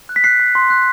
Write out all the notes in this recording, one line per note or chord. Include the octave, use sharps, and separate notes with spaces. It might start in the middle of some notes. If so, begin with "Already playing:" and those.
F#6
B6
F#6 C7
F#6
C6
F#6